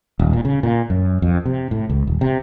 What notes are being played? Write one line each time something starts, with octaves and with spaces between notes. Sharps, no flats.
D#1
A#2
C#3
A#2
F#2
F2
C3
A2
C#2
D#1
C3